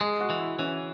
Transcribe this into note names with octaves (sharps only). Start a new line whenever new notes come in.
G#3 G#4
F#4
E3
E4
E3 C#4